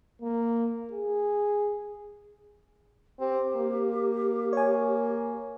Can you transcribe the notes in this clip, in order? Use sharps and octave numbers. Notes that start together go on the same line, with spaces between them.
A#3
G#4
C4 G4
A#3
C#5 G#5